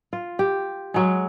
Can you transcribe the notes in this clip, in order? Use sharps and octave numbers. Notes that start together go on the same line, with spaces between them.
F4
G4
F#3 G#3